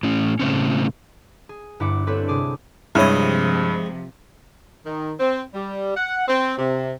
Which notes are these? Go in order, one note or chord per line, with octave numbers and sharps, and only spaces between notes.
A2 C#4
A2 C#3 C4 C#4
G#4
G1 G2 E4 F#5 D6 C#7
C4 D4 E4 A4 B4 C#5
C3 G#4 D6 D7
G2 C3 F3 G#3 E4 C#5 D#5
D#3
C4
G3
F#5
C4
C3